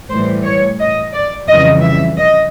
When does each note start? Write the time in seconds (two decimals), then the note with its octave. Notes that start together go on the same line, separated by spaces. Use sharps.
0.10 A2 E3 G3 C5
0.44 C#5
0.80 D#5
1.13 D5
1.48 F2 C#3 E3 G3 D#5
1.83 E5
2.18 D#5